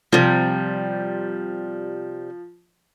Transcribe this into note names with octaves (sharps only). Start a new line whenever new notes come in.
C3 F3 G3